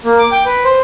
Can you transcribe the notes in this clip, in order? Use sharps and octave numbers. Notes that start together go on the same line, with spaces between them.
A#3
D6
G5
B4
C5